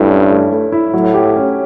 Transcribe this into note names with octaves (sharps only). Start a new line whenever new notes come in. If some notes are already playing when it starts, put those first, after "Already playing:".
Already playing: G2 A3 E4
C#4
A3
A3
E4
A2 F#3
G4
C#4